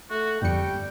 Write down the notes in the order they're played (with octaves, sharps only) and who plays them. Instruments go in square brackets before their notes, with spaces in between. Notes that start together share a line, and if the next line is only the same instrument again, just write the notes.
[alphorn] A3 [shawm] F#4
[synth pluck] G1 F2 C#7 [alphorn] G3 [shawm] G5